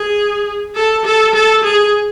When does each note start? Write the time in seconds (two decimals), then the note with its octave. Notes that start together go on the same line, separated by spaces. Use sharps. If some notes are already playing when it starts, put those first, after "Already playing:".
Already playing: G#4
0.75 A4
1.05 A4
1.34 A4
1.63 G#4